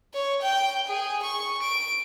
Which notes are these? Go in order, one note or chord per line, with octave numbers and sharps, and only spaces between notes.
C#5
G5
G#4
C#6
D7